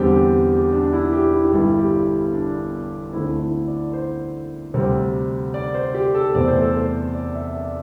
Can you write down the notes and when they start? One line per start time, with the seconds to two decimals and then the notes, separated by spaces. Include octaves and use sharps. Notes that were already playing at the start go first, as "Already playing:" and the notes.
Already playing: E2 D3 G3 C4 G4
0.12 G4
0.52 G4
0.72 D4
0.93 E4
1.13 G4
1.33 E4
1.44 G4
1.52 G1 G2 G3 E4
1.79 G4
2.33 D4
3.13 D2 D3 A3 C4 E4
3.39 E4
3.67 D5
3.93 C5
4.74 D2 C3 G3 C4
5.54 D5
5.74 C5
5.95 G4
6.15 A4
6.34 E2 C3 A3 C4 D5
6.48 C5
6.61 A4
6.75 C5
7.15 D5
7.35 E5
7.55 D5